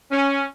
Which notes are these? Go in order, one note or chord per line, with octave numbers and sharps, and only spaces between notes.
C#4